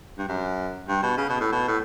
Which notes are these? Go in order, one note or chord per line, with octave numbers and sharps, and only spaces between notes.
G2
F#2
G2
B2
C#3
B2
A2
B2
A2